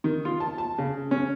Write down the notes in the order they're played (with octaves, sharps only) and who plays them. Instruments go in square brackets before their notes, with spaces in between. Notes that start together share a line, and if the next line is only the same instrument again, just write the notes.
[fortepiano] D#3
F4
A5
A5
C#3
C#4